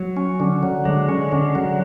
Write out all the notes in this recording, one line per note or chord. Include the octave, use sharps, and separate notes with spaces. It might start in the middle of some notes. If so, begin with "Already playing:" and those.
Already playing: F#3
C#4
D3
F#3
D3 G#3
C#4
D3
F#3